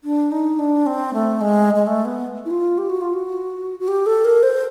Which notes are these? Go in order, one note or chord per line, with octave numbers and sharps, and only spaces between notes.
D4
D#4
D4
C4
A3
G#3
G#3
A3
B3
E4
F4
G4
F#4
F4
F#4
F#4
G4
A4
A#4
C5